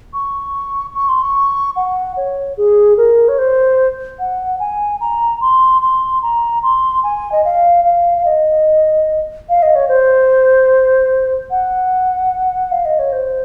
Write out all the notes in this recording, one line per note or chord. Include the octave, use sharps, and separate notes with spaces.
C#6
C#6
C6
C#6
F#5
C#5
G#4
A#4
C#5
C5
F#5
G#5
A#5
C6
C6
A#5
C6
G#5
D#5
F5
F5
F5
D#5
F5
D#5
C#5
C5
F#5
F5
D#5
C#5
C5